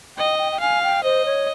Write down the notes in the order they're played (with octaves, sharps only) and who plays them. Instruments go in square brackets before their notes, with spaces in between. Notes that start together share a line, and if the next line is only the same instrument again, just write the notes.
[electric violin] D#5 [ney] G5
[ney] G5
G5
[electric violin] F5 [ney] G#5
[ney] G5
[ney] C5 [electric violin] D#5
[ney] C#5